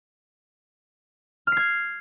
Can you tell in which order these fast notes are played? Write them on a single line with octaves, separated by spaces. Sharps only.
F6 C7 G#6